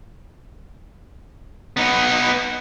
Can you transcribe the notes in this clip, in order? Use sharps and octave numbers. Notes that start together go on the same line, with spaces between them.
B3 D#4